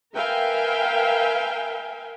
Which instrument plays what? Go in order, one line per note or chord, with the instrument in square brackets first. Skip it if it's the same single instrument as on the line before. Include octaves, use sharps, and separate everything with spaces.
[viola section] A#4 B4 E5 F5 G5 G#5